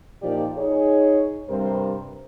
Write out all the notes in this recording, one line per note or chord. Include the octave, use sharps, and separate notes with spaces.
A#2 F3 D#4 G4 A#4 D5
D#4 G#4 C#5
G2 C3 G3 A#4 C5